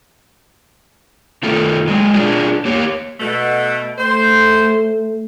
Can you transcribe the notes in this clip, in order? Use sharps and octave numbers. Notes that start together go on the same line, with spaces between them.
D#3 A3 F4 A4
F#3 G#3
D4 F4 G#4
A#3 G4 C#5
B2 A3
A3 C5